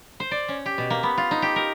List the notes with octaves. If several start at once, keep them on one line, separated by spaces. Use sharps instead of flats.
C5
D5
C#4
G4
B2
A#3
B3
F4
D#4
G4
A#4